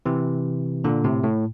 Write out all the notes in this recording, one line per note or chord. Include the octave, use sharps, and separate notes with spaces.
C3 E3
A#2 D3
A2 C3
A2